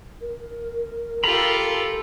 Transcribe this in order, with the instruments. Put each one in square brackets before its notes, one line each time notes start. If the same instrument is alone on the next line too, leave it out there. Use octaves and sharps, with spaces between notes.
[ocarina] A#4
[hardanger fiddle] F4 G4 [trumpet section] A4 [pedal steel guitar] A#5 B5